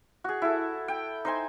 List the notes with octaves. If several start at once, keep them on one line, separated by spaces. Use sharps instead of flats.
F#4 G#4
E4 A4
G5
D#4 C5 G#5